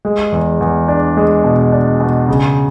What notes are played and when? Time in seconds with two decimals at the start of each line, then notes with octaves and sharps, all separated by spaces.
0.05 G#3
0.32 E2
0.61 E2
0.88 D4
1.17 G#3
1.44 B2
1.72 D4
2.00 B2
2.28 C#3